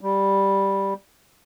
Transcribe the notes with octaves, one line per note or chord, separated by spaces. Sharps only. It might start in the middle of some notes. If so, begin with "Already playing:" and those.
G3